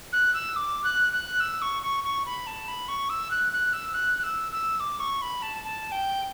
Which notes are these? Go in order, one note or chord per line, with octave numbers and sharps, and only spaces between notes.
F#6
E6
D6
F#6
F#6
E6
C#6
C#6
C#6
B5
A5
B5
C#6
E6
F#6
F#6
E6
F#6
F#6
E6
E6
D6
C#6
B5
A5
A5
G5